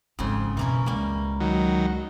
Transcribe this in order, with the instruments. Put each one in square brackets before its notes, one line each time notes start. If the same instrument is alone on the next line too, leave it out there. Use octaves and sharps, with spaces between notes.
[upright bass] G#1 G#2 [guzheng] F2 C#3
[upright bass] F#2 B2 [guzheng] E3 A#3 C#4
[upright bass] C#2 G#3 [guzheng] G3 A#3
[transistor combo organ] D#3 F#3